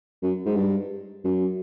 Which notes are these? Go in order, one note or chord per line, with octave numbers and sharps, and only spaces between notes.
F#2
G#2
G2
F#2